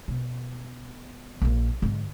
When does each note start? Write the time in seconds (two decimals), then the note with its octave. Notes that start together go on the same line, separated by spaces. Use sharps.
0.08 B2
1.42 A#1 A#3
1.82 G#2 D3